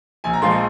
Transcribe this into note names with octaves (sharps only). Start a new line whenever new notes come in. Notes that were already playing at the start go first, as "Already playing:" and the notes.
A#1 G#5
A#5
A#2 F3 G#3 C6
C#6